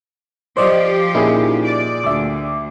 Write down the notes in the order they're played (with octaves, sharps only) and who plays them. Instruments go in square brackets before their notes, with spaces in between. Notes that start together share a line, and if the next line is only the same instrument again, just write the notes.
[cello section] F3 G4 [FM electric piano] C5 D5 D#5
[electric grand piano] A#2 G#4 [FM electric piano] C#4 D#4 E4
[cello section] D5
[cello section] D2 [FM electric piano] E5 D6